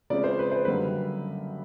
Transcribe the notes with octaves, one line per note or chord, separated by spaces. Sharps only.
C#3 F3 G#3 C4 D5
C5
B4
C5
F#2 D3 G3 A#3 B4